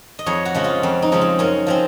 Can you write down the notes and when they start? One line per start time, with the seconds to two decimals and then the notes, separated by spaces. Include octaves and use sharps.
0.19 D#5
0.26 F2 C#5
0.45 F#4
0.54 C#3 F3 G#3
0.64 F4
0.83 F2 C4
1.02 D#4
1.12 C#3 F3 G#3
1.21 C4
1.39 F#2 C#4
1.67 F3 G#3 C4